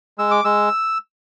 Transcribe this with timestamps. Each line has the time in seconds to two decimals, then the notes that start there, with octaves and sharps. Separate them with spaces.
0.18 G#3 E6
0.31 D6
0.44 G#3 E6